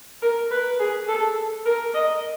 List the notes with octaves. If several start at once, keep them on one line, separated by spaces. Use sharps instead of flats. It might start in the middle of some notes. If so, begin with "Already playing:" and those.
A#4
B4
G#4
A4
A#4
D#5